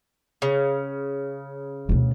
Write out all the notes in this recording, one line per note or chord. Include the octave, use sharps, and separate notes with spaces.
C#3
D2 B2